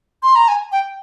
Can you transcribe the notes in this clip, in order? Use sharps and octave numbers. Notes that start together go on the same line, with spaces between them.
C6
A#5
G#5
G5